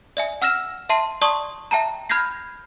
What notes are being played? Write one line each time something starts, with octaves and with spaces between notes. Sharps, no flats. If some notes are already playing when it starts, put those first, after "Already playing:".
D5 E5 G#5
F#5 E6 F6 A#6 E7
E5 A5 C6 C7 D#7
D5 A5 C6 C#6 D#6
E5 G5 A5 A#5
B5 F6 G6 G#6 A#6 C7